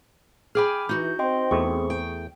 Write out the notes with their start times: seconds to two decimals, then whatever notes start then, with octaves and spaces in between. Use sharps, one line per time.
0.55 G#4 G5 G#5 B5 D6 F6
0.89 E3 D#4 F#4 G6
1.19 C4 D#5 G5 C6
1.51 E2 A3 G#4 C#6
1.90 G5